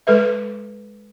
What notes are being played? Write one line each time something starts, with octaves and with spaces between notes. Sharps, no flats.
G#3 A4 B4 E5